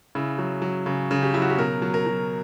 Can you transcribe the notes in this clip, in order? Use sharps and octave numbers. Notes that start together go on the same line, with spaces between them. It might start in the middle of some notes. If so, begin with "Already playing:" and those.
C#3 E4
F#3
F#3
C#3
C#3
G4
F#3 E4
F#4
G4
B2 A#4
F#3
A#4
F#3